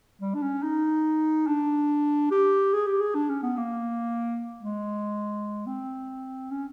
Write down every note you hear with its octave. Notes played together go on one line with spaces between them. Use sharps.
G3
D4
C#4
D#4
D4
G4
G#4
G4
G#4
D4
C#4
B3
A#3
G#3
C4
C#4